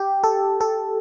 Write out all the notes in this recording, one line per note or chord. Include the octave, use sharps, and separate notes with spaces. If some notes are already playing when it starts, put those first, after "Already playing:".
Already playing: G4
A4
A4